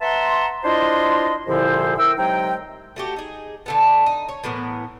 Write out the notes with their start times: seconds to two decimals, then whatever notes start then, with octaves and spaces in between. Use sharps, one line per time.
0.01 B4 E5 F#5 A5 A#5 C6
0.64 D4 E4 F4 C5 D#5 C6
1.47 C2 A#2 D3 F3 E4 C5
1.98 E4 A#4 C5 G5 E6
2.18 C3 F#3 G#3 D#4 G5
2.96 A3 F#4 G4
3.16 D#4 G#4
3.66 D3 A3 B3
4.06 D#4
4.29 C#5
4.44 A2 E3 B3 A#4